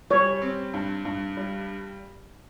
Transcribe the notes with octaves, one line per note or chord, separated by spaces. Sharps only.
G3 C#5
C4
G2
G2
G3